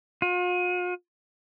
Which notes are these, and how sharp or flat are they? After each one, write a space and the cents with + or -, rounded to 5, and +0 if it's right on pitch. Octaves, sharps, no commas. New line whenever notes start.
F4 +45